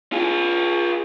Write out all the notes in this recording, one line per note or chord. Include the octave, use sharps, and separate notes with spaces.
F4 G#4